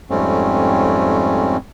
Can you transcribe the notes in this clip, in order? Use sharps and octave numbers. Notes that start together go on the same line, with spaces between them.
F2 G#2 G3 A3 C4 C#4